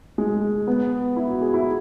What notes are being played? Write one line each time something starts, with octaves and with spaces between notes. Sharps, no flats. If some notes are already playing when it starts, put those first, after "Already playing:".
G#3
B3
E4
F#4
G#4
E4